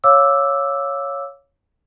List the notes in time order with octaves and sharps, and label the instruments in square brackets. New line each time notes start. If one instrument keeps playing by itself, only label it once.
[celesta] C#5 F5 D6 E6